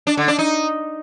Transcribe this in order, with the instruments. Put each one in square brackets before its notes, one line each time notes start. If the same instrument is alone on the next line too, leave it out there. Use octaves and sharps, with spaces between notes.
[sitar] D4
D3
D4
D#4